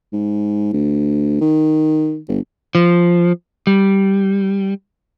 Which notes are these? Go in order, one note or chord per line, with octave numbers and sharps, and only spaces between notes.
G#2
D2
D#3
G1
F3
G3